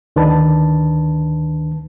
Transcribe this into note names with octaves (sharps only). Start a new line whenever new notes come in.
D2 D#3 D4 B4 A5